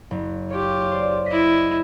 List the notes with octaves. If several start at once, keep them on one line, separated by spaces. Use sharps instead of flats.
F#1
F4 G4 C#5
C5 D5
E4 D#5 B6